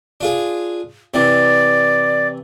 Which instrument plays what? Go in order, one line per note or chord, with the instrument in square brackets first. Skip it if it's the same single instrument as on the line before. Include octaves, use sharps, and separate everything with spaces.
[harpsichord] D4 F4 G#4
[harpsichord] C3 E3 [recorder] D5